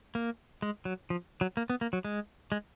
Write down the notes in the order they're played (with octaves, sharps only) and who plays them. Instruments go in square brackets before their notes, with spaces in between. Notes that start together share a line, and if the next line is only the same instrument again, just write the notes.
[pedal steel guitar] A#3
G#3
F#3
F3
F#3
A#3
B3
A#3
F#3
G#3
G#3